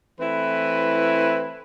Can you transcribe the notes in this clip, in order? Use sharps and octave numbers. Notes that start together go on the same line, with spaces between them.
E3 A3 C4 E4 B4